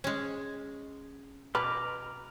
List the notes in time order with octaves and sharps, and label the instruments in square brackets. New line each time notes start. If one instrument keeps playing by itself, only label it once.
[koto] G#3 C#4
[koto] B2 [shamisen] B4 [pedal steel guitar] A#5 D6 F6